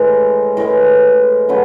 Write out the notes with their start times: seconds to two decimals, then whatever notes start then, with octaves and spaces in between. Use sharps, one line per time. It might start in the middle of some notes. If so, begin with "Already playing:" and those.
Already playing: A2 E3 G#3 A#4
0.57 A2 E3 G#3 A#4
1.49 C#3 F#3 A3 B4